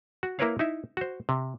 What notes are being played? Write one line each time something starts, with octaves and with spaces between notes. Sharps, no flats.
F#4
A#3 E4 A#4 B4 C#5 F5
D#4 E4 E5
F#4 C5
C3